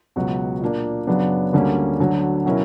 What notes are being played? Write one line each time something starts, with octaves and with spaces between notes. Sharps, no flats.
C#2 B2 F#3 B3 F#4
A#2 A#3 D4
F#2 C#3 F#3 B3 D4
D2 D3 G3 A#3 C#4
D2 D3 F#3
B2 F#3 C#4 E4 A#4